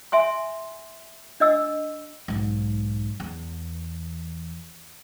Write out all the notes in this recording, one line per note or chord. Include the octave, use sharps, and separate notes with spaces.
E5 G#5 C6
D4 D#5 E6
B1 G#2
E2